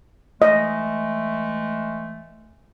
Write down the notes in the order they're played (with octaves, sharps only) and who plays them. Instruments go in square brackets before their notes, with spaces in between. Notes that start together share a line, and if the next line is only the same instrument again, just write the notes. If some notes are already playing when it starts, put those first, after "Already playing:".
[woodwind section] E3 G#3 A3 [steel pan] D#5